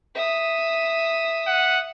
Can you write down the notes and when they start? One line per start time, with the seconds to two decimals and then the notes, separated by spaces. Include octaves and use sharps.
0.15 E5 D#6
1.47 F#5